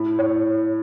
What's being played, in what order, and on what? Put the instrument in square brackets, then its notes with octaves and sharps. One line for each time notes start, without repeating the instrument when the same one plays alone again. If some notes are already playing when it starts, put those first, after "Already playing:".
Already playing: [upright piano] A2 E4
C#5